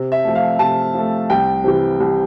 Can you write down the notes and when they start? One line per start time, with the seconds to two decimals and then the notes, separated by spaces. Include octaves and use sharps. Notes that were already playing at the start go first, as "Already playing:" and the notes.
Already playing: C3
0.12 E5
0.24 F3 A3
0.35 F5
0.59 C3 A5
0.94 F3 A3
1.30 C2 G5
1.64 C3 E3 G3
2.00 C2